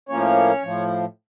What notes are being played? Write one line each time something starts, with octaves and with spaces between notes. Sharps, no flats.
A2 F3 A#3 C#4 C#5
A2 F3